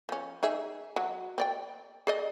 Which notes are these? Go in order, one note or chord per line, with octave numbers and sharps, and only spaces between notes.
F3 C#4
D#4 G#4 E5
F#3
C4 D5 G5
G#4 D5 D#5